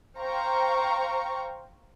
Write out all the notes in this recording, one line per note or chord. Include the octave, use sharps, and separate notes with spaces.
C5 F5 G5 A#5 C#6